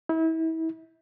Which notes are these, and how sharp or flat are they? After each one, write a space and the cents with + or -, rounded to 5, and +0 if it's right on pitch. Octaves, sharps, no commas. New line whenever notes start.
E4 -35